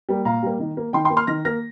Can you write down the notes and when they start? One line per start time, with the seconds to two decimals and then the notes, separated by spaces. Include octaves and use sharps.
0.09 G3 A#3
0.25 A#2 F5 A#5
0.43 G3 A#3
0.60 D#3
0.77 A#3
0.93 D#3 G5 C6
1.05 G5 C6
1.10 A#3
1.17 C6 F6
1.27 D#3 F6 A#6
1.45 A#3 F6 A#6